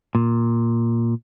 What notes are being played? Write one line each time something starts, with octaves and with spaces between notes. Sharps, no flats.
A#2